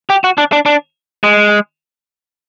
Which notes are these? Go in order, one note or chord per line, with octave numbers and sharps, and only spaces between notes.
G4
F#4
D4
D4
D4
G#3